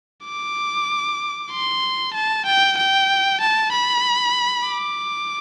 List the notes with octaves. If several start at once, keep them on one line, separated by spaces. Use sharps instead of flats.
D6
C6
A5
G5
G5
A5
B5
D6